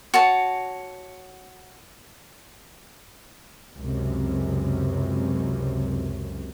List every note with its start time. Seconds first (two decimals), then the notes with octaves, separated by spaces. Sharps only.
0.14 F#4 C#5 A5
3.76 C#2 F#2 C3